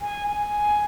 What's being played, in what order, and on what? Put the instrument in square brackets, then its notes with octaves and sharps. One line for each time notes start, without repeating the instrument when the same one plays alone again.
[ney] G#5
G#5